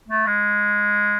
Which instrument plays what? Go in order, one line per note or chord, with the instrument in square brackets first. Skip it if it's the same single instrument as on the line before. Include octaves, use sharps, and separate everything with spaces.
[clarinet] A3
G#3